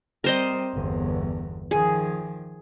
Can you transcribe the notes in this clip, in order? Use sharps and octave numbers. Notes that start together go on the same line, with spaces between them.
G3 C4 A#4 C5 D#5
G1 E2
D#3 F3 G#4